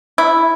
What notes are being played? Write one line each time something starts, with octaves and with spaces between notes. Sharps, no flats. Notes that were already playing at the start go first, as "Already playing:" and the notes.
E4